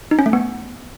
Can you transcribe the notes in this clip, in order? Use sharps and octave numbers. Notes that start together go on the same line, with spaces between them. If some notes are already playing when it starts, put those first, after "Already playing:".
D#4
C#4
A3
B3